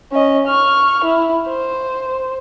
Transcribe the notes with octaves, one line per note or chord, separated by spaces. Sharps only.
C#4 D#5
C#6 F6
E4
C5